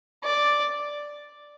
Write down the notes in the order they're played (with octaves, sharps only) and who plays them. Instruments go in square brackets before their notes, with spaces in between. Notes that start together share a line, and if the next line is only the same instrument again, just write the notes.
[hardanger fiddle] D5